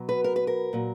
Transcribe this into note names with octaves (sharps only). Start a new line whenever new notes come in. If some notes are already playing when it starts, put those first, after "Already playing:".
Already playing: B2 F#3
B4
A#4
B4
A#4
A#2 F#3